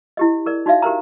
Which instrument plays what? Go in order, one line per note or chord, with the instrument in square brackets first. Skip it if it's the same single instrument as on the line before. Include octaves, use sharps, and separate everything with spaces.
[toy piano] E4 G4 D#5
G#4 A#4 D5
D#4 F#4 D5 E5 F5
G4 A#4 C5 A#5